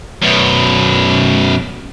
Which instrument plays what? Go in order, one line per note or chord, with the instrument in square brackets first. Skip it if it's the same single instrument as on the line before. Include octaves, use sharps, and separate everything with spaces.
[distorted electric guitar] F#2 B2